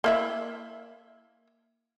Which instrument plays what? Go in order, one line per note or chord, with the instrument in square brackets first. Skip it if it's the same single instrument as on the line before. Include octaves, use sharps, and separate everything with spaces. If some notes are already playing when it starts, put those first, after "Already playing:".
[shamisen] A#3 E4 E5